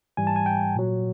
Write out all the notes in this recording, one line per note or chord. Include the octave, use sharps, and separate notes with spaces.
G#2 E3 G3 G#5
A5
G#5
G5
A#2 F#3